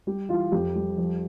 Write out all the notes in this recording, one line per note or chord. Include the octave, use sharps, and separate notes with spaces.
G3 G4
E3 F4
F2 G4
G3
F3